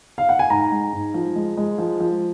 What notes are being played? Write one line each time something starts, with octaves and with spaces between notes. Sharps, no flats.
F5
F#5
G#5
G#2 A#5
G#3
G#2
F3
G#3
G#3
F3
F3